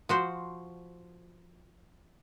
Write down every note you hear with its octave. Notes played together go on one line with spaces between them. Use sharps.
F3 F#4 C5